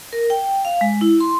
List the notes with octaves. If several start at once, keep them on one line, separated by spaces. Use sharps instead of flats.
A#4
G5
F5
G#3
E4
C6